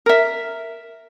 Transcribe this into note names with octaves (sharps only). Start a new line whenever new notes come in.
A#4 E5